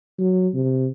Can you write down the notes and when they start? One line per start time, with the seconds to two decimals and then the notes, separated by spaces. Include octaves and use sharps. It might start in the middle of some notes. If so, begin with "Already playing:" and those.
0.18 F#3
0.54 C3